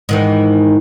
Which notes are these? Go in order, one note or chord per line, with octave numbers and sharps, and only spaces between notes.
G#2 D#3 E3